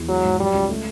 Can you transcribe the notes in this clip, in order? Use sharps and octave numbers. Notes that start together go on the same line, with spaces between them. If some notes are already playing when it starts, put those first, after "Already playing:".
Already playing: E2
F#3 G#3
G#2
F#3 G3
C#2
A3